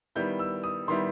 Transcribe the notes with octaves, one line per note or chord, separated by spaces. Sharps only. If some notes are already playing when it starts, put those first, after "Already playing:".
D#3 G3 B3 E4 G6
E6
D#6
D#3 G3 B3 E4 C6